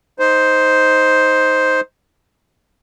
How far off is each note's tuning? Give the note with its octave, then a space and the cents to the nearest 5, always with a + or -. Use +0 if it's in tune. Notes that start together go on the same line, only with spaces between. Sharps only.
D#4 +10 C5 +0